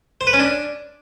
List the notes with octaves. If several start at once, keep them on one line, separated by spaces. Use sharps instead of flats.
C5
B4
C#4
D4